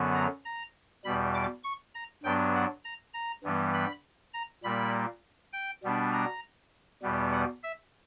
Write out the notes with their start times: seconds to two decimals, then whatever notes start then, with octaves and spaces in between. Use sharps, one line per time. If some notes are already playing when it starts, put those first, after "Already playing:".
Already playing: F#2 D3 F#3 B3
0.14 A#5
0.45 A#5
1.05 E2 B2 G3 B5
1.34 D6
1.64 C#6
1.95 A#5
2.24 G2 F#3 B3 D4 G5
2.54 F#5
2.85 A#5
3.14 A#5
3.44 G2 E3 G3 B3
3.74 B5
4.33 A#5
4.64 A#2 G3 A#3 B5
5.53 G5
5.84 B2 G3 B3 D4
6.13 A#5
7.02 E2 B2 G3 B3
7.32 F#5
7.63 E5